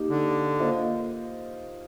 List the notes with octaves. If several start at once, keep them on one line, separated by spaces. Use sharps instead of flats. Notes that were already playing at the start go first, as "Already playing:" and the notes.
Already playing: A#3 D#4 G4
D3
A#3 F4 C5 D#5